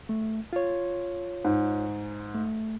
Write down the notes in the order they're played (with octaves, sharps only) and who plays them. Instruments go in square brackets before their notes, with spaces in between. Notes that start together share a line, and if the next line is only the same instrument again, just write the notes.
[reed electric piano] A3
F4 C#5
[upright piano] G#2
[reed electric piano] A3